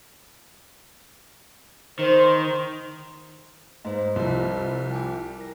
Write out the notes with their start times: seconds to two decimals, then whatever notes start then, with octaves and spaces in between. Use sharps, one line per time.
1.99 D#3 C5
3.85 G#2 B4 C5 D#5
4.16 C2 F3 E4
4.91 G5 G#5 D6
5.38 A#4 A#6